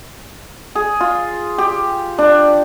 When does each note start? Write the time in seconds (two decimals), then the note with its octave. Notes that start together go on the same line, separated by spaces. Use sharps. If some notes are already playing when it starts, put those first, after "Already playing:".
0.75 G#4
1.01 F4
1.58 G4
2.19 D4